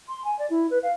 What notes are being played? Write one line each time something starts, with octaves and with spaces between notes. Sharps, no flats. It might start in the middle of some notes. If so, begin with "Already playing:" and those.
C6
G#5
D5
E4
B4
F5